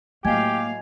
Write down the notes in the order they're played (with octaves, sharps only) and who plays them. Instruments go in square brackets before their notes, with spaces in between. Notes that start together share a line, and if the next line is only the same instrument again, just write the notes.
[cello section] A2 F#3 F5 [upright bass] A#3 [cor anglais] G4 [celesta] D#5 G#5 G#6